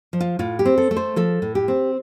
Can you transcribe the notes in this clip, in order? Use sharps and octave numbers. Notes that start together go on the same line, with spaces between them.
F3
F4
A2 F4
G4
C4
A4
A3
C5
F3 A4
A2
G4
C4